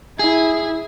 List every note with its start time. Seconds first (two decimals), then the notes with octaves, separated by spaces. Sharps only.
0.19 E4 G#4